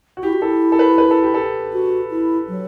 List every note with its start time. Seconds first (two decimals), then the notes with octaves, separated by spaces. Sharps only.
0.17 F#4
0.23 E4 G4
0.33 F#4
0.41 E4 A4
0.72 A4
0.79 B4
0.98 B4
1.11 A4
1.23 G4
1.34 A4
1.73 F#4
2.11 E4
2.48 F#3